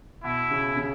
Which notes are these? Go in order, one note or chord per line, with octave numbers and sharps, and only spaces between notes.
B2 E4
C#3
C#3